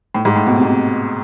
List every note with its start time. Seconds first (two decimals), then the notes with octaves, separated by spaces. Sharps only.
0.14 A2
0.25 G#2
0.36 A2
0.46 B2
0.56 C3
0.64 B2